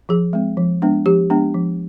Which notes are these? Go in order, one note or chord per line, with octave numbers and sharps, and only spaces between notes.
F3 G#4
G#3 C4
F3
G#3 B3 D4
F3 G4
G#3 B3 D4
F3